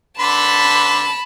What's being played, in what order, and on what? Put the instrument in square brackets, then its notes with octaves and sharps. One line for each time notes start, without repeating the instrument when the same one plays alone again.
[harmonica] D3 B4 C6 [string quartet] A5 B5